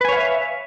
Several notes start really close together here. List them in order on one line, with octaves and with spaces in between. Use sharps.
B4 G#5 C#5 F5 E5